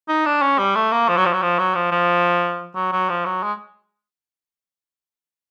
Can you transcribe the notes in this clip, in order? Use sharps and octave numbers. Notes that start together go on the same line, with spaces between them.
D#4
D4
C#4
G3
A3
A#3
F3
F#3
F3
F#3
F3
F#3
F3
F3
F#3
F#3
F3
F#3
G#3